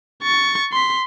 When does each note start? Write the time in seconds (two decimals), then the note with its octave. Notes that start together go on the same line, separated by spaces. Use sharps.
0.23 C#6 A6
0.72 C6 B6